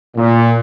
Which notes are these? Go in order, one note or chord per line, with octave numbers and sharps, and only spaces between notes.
A#2